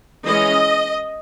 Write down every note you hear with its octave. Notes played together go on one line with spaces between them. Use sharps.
E3 G#3 C#4 D#5